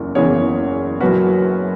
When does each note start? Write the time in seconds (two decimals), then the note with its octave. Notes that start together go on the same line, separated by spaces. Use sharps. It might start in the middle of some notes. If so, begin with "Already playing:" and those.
Already playing: F#1 E2 C#3 E3
0.15 F#1 E2 C#3 E3 G#4 C#5
1.00 F#1 F#2 F#3 F#4 B4